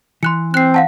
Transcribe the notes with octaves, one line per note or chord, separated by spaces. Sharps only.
E3 C6 F#6 C#7
C4 F#6 C7
F5 F#5 A5